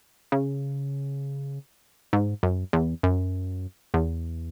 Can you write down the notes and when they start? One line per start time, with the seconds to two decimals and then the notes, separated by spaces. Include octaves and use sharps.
0.32 C#3
2.13 G#2
2.43 F#2
2.73 E2
3.03 F#2
3.94 E2